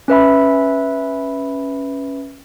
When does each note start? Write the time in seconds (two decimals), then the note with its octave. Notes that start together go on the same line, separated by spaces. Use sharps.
0.08 C#4 B4 E5 B5